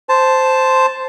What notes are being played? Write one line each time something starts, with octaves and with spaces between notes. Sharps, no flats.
C5 A5